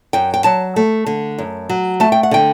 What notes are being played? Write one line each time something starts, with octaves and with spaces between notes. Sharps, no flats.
F#2 G5
G5
F#3 A5
A3
D3
F#2
F#3
A3 A5
G5
F#5
D3 G5